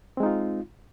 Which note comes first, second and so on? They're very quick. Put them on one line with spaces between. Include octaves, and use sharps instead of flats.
C4 G#3 D#4 F4